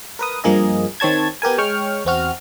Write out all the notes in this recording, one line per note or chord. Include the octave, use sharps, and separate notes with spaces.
A#4 B4 D#6
G2 F3 A#3 G#4 D#5
D#3 C4 C#5 A5 G#6
B3 G4 A#4 G#5
G#3 C#5 G5 C#6 F6
E2 C4 F#4 F6